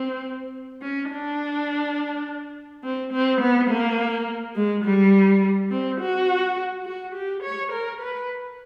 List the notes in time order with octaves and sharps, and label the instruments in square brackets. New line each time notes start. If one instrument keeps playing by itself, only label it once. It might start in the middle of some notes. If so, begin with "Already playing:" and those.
Already playing: [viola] C4
C#4
D4
C4
C4
B3
A#3
G#3
G3
C4
F#4
F#4
G4
C#5
A#4
B4